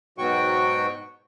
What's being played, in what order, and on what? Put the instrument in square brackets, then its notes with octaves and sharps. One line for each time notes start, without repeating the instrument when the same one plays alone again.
[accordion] G#2 B2 F#3 F#4 G5 C#6